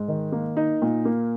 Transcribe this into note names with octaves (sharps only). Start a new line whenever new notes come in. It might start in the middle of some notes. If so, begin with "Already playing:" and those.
Already playing: G#2
D#3
A#3
D#4
A#2
A#3